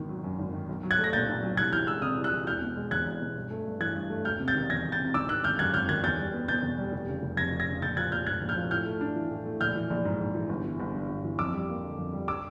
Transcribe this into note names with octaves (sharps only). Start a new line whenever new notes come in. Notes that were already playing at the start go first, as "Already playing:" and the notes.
Already playing: G#1 B2 D#3
F#3
F#2
G#1
D#3
B1
F#3
F#6 G#6
A3
A#6
A#2 G6 A6
B1
F#3
C2 F#6 G#6
E3 F6 G6
G#3 E6 F#6
C3 D#6 F6
C2
E6 F#6
E3
E1 F6 G6
B2
G#3
E2 F#6 G#6
E1
B2
G2
A3
G2
E3 F#6 G#6
G2
A3
E1 F6 G6
C3
G6 A6
D#3
E2 G#6 A#6
E1
G6 A6
C3
G#1 D6 E6
D#3 E6 F#6
G#1 F6 G6
F#2 F#6 G#6
G#1 F6 G6
D#3 F#6 G#6
E2 G6 A6
G3
B3
B2 G6 A6
E2
G3
F1
C#3
F1
F2 G#6 A#6
F1
G#6 A#6
C#3
A#1 G6 A6
F3 F#6 G#6
A#1 F6 G6
G#2 F#6 G#6
A#1
F6 G6
F3
A2 F6 G6
A3
D4
E3
A2
A3
A#1 F6 G6
E3
A#1
G#2
A#1
E3
G1
E3
G1
G2
G1
E3
F2 D6 E6
G3
A#3
D3
F2
G3
D6 E6